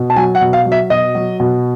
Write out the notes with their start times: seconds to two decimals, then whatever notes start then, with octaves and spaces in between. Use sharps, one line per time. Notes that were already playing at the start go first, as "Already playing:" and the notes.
Already playing: B2
0.10 A5
0.16 F#3 G#5
0.35 F#5
0.41 B2
0.53 F5
0.65 F#3
0.72 E5
0.90 B2 D#5
1.15 F#3
1.40 B2